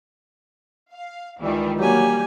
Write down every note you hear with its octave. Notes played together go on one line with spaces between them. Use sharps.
F5
C#2 D#3 E3 G3
F#3 G3 A#3 G4 G#5